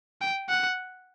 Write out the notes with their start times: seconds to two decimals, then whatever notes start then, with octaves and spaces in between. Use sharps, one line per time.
0.21 G5
0.49 F#5